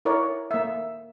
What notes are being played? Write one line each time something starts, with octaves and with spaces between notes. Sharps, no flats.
E4 A#4 C#5 D5
A#3 E5